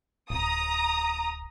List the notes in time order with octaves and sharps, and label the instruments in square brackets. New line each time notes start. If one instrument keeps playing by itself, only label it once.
[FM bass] D1 [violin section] A#5 D#6